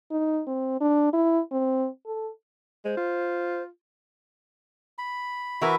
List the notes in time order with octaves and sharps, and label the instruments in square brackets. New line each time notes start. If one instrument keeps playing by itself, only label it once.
[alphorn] D#4
C4
D4
E4
C4
A4
[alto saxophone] G#3 [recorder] C5
[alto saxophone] F4
[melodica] B5
[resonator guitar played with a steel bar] E3 A#4 B4 [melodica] F#4 E5